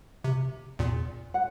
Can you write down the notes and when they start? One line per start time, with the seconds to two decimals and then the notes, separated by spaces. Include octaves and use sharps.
0.24 C3
0.79 E2 A#2
1.34 F#5